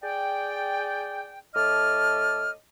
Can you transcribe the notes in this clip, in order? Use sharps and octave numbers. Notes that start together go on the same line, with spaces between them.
G#4 D5 G5
A2 D#5 A5 D6 F6